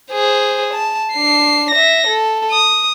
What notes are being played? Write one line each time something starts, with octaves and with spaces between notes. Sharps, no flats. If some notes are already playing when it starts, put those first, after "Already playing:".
G#4 C5
A5
D4 C7
E5 A#6
A4
D#6